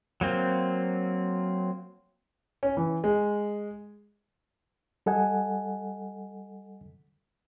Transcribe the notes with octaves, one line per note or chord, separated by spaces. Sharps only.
F#3 A#3 C4
C#4
E3
G#3
G3 A4 D#5 F#5 G#5